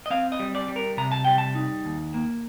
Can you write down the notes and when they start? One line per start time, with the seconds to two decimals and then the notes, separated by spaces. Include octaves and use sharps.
0.06 D#5
0.10 C4 F5
0.32 D#5
0.40 G3
0.55 D5
0.68 G3
0.76 A#4
0.98 C3 A#5
1.12 A5
1.25 G3 G5
1.38 A5
1.55 D#4
1.85 D#2
2.14 A#3